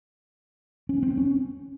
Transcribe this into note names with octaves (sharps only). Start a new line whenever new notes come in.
C#4
C4
C#4